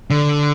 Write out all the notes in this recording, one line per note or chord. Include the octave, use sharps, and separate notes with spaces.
D3